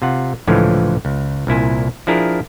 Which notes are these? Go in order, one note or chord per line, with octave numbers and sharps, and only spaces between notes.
C3 F4 F#5
C#2 A2 D3 E3 F3 C#4
C#2
C2 A#2 E4 G#5
F3 D4 E4 G#4 A#4